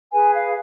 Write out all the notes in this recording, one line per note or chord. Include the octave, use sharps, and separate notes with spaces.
G#4 B4 G#5
F5